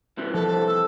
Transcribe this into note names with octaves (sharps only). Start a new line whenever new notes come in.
C2 C3 E3
F3 A4
A4 E6